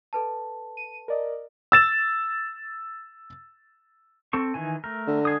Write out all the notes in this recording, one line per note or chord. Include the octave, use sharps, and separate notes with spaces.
A4 B4 A5
D#7
A#4 D5 D#5
E6 A6 E7
C4 A4 C#6
D#3 E3 G#5
A3 A#4
D3
G#3 G#4 D#6